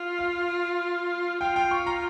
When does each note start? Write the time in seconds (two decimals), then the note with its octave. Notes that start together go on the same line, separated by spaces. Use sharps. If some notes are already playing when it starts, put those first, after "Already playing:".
Already playing: F4
0.19 F5
1.41 F4 G5
1.56 G5
1.71 C#6
1.87 A#5